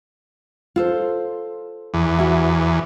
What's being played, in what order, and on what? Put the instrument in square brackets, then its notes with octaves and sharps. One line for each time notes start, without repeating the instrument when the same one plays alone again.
[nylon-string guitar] F4 A4 C5
[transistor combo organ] E2
[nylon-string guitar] F#4 E5